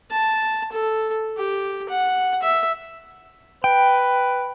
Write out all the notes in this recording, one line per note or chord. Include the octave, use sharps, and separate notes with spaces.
A5
A4
G4
F#5
E5
B4 G5